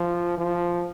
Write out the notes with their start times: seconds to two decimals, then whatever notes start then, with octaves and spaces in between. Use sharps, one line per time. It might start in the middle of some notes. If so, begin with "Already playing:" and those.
Already playing: F3
0.38 F3